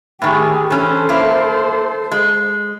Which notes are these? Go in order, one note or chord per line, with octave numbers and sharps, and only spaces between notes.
A2 D#3 G4 G#4
E3 C#4 A4 C5
A#3 E4
G#3